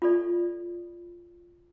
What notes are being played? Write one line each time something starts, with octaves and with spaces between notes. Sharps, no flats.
F4 A4 D5